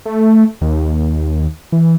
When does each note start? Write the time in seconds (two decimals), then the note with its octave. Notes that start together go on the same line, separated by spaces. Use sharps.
0.06 A3
0.61 D#2
1.72 E3